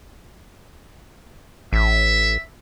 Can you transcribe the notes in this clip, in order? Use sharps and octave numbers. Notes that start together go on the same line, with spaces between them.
A1 E5